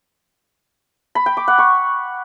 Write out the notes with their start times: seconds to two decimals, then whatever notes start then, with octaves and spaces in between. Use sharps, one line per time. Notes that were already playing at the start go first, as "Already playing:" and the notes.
1.15 B5
1.26 G5
1.37 D6
1.48 F#5
1.58 C#6